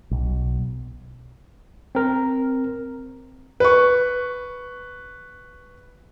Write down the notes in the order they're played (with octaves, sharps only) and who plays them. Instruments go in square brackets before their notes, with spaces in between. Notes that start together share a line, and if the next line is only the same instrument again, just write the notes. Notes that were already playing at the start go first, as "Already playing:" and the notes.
[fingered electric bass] B1
[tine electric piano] C4 A#4
[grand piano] B4 C#6